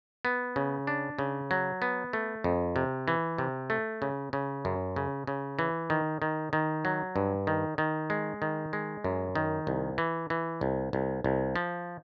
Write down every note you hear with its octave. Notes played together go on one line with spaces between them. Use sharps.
B3
C#3
D4
C#3
F#3
B3
A3
F2
C3
E3
C3
A3
C#3
C#3
F#2
C#3
C#3
E3
D#3
D#3
D#3
F#3
G2
D#3
D#3
G#3
D#3
G#3
F#2
D#3
C2
E3
E3
C2
C2
C2
F3